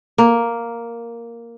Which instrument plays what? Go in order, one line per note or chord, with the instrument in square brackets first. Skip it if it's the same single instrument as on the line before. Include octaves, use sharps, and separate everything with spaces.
[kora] A#3